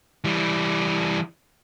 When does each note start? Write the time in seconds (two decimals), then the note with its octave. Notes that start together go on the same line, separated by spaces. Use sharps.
0.24 E3 G3